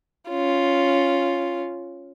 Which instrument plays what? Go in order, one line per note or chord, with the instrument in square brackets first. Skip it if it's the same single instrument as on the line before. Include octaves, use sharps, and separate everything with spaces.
[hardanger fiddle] C#4 F4